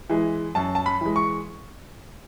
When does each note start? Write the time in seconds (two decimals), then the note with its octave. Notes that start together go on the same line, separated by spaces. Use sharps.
0.10 E3 G#3
0.55 F#2 A5
0.75 A5
0.86 B5
1.01 E3 G#3
1.16 C#6